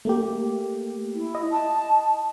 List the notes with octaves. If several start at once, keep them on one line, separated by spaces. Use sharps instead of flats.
A3 A#3 G4
E4
D#5
A5